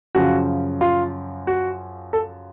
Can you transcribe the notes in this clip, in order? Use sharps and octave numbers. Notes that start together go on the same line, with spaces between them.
F#2 C#3 F3 F#4
F4
F#4
A4